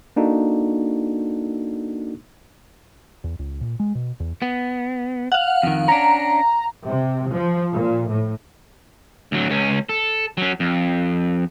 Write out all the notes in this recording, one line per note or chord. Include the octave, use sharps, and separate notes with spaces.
A#3 D4 D#4 F#4 A4
E2
C#2
A#2
G#3
B2
E2
B3
F5 F#5
F2 D#3
C#4 D4 A#5
C3
F3
A#2
A2
D2 F#3
C#2 C#4
A4
F#3 C#4
F2